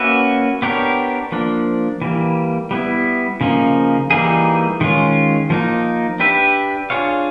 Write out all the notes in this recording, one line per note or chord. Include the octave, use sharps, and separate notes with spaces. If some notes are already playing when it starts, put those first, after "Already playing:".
Already playing: A#3 C#4 F#4 B4 E5
B3 D4 G4 A#4 C#5
F3 A#3 D4
E3 G3 A#3
G3 B3 E4
C#3 F3 A#3 D#4
E3 G3 A#3 D#4 G#4
D#3 G#3 C#4 F4
F3 A#3 D#4
D4 G4 B4 E5
D4 F4 G#4 C#5 F5